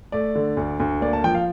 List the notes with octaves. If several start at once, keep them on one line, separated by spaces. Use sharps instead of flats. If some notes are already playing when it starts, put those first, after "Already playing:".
A3 D5
D3
D2
D2
A#3 D5
A5
F3 G5
F5